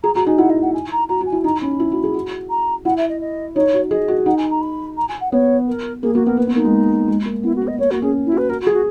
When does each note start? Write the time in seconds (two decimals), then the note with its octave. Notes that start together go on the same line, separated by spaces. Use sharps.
0.03 G#4 A#5
0.15 F#4 A#5
0.27 D#4 G#5
0.38 E4 F#5
0.50 D#5
0.62 F#5
0.74 G#5
0.91 A#5
1.09 F#4 A#5
1.21 F#4
1.26 G#5
1.32 E4
1.44 D#4 A#5
1.62 C#4 B5
1.80 E4
1.92 F#4
2.04 G#4
2.14 F#4
2.50 A#5
2.85 E4 F#5
2.97 E5
3.09 D#5
3.21 D#5
3.56 D#4 C#5
3.73 F#4
3.91 G#4 D#5
4.08 F#4
4.26 D#4 F#5
4.38 G#5
4.50 A#5
4.61 B5
4.97 A#5
5.09 G#5
5.21 F#5
5.32 B3 C#5
5.67 A#4
6.03 A#3 G#4
6.15 A#3 F#4
6.26 B3 A#4
6.37 A#3 B4
6.47 B3
6.55 A#3 D#4
6.65 G#3
7.08 G#3
7.25 A#3
7.43 B3 E4
7.56 F#4
7.62 B3
7.67 D#5
7.78 A#3 C#5
7.91 A#3 F#4
8.02 C#4 G#4
8.26 E4
8.32 F#4
8.38 B4
8.49 F#4 A#4
8.61 F#4
8.67 G#4
8.73 F#4